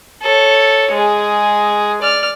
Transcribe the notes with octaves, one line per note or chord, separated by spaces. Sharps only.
A4 C#5
G#3 G#4
D5 F6